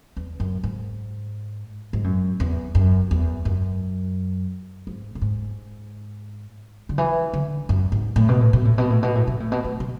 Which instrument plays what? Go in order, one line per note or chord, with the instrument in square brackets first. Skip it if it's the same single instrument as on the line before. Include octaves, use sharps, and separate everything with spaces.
[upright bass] E2
F#2
G#2
G#2
F#2
E2
F#2
E2
F#2
G#2
A2
G#2
D3
E3
D3
F#2
G#2
A2
B2
A2
B2
A2
B2
A2
B2
A2
B2
A2
B2
A2
B2